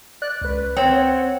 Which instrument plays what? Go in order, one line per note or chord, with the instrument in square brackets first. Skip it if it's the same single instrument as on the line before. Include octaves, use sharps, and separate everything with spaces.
[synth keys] D5 F#6
C#2 B4
[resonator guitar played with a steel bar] C4 [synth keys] C#5 F#5